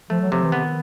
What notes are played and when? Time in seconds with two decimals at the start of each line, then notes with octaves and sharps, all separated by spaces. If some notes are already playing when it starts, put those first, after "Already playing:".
0.10 F3 A3
0.21 F#3
0.32 C3 F3
0.43 E3
0.52 D#3 B3